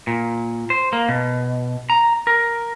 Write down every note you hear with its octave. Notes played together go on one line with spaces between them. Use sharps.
A#2
C5
A#3
B2
A#5
A#4